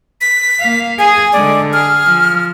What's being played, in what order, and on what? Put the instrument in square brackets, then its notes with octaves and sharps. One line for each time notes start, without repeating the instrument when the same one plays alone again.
[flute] B6
[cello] A#3 F5
[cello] G#4 [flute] G#5
[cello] D3 G#3 [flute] D5
[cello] G#4 [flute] F6
[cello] F3